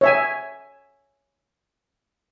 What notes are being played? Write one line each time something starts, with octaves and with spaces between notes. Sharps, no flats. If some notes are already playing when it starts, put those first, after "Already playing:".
C#5 E5 G#5